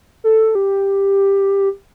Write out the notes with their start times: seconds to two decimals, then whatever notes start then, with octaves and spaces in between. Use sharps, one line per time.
0.24 A4
0.55 G4